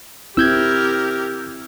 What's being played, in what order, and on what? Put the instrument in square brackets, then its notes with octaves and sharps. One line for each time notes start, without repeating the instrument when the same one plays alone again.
[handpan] C4 E4 [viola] G4 A#4 [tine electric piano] E6 G6 G#6